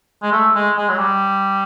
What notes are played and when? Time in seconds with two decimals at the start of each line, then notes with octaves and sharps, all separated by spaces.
0.22 G#3
0.32 A3
0.55 G#3
0.77 G#3
0.89 F#3
0.99 G3